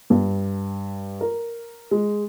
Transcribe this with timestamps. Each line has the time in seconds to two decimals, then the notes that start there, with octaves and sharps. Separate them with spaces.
0.10 G2
1.21 A#4
1.91 G#3